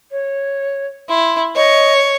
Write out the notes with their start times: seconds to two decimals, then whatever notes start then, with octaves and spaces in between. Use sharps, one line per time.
0.11 C#5
1.09 E4 C6
1.55 C#5 D#5